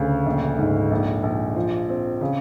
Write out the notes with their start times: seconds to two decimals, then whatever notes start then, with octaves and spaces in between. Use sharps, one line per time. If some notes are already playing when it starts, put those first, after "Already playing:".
Already playing: D2 C#3
0.26 A#1
0.59 G#2
0.91 A#1
1.23 A#1
1.56 F3
1.89 C4
2.21 C#3